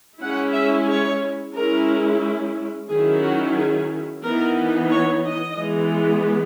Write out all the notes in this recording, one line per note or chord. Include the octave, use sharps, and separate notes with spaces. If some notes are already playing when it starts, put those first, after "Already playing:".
G#3 C#4 E4 F#5
E5
C#5
G#3 C#4 E4 A#4
D#3 F#3 C#4 E4 G#4
F#4
G#4
E3 B3 D#4 A#4
C#5
D#5
E3 G#3 B3